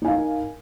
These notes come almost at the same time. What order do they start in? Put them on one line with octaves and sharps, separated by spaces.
D#4 G#5 F5 A#4